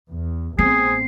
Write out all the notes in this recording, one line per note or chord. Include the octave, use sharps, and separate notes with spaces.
E2
A1 B3 C4 G#4 C7